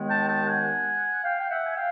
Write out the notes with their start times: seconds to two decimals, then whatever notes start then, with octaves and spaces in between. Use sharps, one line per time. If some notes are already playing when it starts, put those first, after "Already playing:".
Already playing: D#2 D#3 G#3 B3
0.09 G5 A5
0.28 G5 A5
0.48 F#5 G#5
1.24 F5 G5
1.39 G5
1.50 E5 F#5
1.65 G#5
1.76 F5 G5